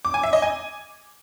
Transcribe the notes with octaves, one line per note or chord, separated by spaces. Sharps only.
D6
G#5
E5
D#5
G#5